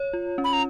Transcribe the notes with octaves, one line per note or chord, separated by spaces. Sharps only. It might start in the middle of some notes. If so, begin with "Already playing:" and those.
Already playing: C#5
F4
C#4
B5
A#5